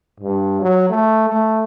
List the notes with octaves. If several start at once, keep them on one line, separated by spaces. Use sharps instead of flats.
G2
F#3
A3
A3